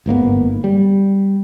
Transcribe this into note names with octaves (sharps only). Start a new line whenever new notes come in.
G1 G#2 A#3 B3
G3